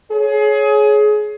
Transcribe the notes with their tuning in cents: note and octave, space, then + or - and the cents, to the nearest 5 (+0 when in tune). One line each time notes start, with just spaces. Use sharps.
G#4 +25 C#5 +0